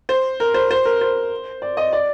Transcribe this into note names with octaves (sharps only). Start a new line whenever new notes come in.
C5
A#4
C5
C5
A#4
C5
D5
D#5
D5